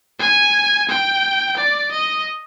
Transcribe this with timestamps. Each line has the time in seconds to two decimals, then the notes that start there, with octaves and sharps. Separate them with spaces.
0.19 G#5
0.88 G5
1.57 D5
1.92 D#5